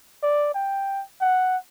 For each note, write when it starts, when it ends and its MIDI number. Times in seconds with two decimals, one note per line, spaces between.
0.23 0.52 74
0.55 1.02 79
1.21 1.57 78